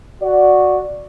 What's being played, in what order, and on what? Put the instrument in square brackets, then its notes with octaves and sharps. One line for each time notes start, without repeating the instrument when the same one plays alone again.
[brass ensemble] F#4 D5